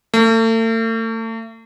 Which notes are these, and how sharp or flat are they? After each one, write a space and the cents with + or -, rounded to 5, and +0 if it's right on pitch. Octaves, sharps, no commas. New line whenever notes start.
A3 +40